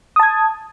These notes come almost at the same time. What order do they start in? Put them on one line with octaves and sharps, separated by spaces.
D#6 A5 G#6